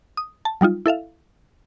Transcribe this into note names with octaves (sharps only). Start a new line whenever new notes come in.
D#6
A5
F#3 G3 D#4 F4
E4 A4 E5 F5